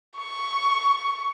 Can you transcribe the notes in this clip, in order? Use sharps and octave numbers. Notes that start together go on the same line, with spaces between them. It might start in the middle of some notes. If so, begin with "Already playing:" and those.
C#6